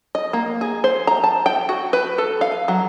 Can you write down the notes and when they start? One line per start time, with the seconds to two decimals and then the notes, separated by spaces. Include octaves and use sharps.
0.15 D#5
0.33 A#3
0.61 G#4
0.84 C5
1.07 A#5
1.24 A5
1.46 G5
1.69 F#4
1.93 B4
2.18 A4
2.41 F5
2.68 F#3